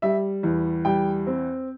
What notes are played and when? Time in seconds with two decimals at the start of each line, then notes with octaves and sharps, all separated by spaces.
0.02 G3 E5
0.43 E2
0.85 G3 G5
1.27 C4